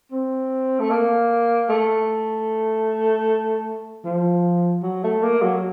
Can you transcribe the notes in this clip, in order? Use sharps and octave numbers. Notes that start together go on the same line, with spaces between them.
C4
A3
A#3
A3
F3
F#3
A3
A#3
F#3